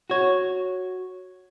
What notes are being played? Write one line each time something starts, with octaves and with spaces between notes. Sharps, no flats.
F#4 C#5